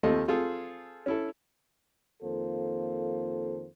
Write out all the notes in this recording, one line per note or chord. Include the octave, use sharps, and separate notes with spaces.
D#2 A3 C4 F4 A4 D#5
C4 F4 G#4 A4
C#4 E4 A4
F2 D#3 A#3 F4 A4 C5